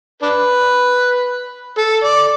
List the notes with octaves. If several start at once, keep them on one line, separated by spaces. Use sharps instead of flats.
D4 B4
A4
D5